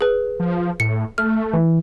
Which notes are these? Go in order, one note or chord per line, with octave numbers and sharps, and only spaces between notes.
G#4 B4
F3
A2 C#7
A3 F6
E3